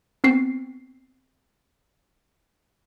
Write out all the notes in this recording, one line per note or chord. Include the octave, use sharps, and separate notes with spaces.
B3 C4 C7